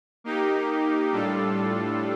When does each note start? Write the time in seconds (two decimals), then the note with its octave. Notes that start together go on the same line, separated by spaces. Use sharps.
0.24 A#3 D#4 G4
1.12 A2 G3 D4 F4 A4